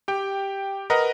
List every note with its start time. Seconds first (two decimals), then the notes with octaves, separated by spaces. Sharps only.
0.08 G4 G5
0.90 A#4 B4 D#5 F#5 A#5